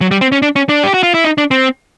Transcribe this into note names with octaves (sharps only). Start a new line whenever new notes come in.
F#3
G3
C4
C#4
D4
C#4
D4
G4
F#4
F4
E4
D#4
D4
C4